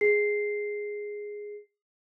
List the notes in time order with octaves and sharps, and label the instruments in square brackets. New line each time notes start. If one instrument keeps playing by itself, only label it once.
[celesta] G#4 C7